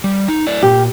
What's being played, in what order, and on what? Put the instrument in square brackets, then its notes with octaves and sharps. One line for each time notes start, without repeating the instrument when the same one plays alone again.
[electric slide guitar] G3
D#4
A3 E4 D5
[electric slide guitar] A#2 [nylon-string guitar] G4